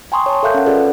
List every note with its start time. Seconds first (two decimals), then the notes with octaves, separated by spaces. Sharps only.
0.12 G5 G#5 A#5 C6 C#6 D#6
0.26 C#5 A5
0.43 A4 A#4 E5 F5 F#6 G6
0.54 C#4 F#5
0.66 F4 G#4 A4 B4 D5 F#5